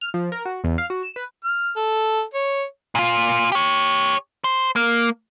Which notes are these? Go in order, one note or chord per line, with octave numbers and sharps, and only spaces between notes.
F6
F3
A#4
F#4
E2
F5
F#4
E7
B4
F6
A4
C#5
A#2 F4
G4 C#5
C5
A#3